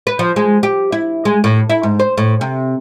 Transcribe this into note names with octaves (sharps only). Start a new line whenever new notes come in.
B4
F3
G#3
G4
E4
G#3
A2
E4
G#2
C5
A2
C3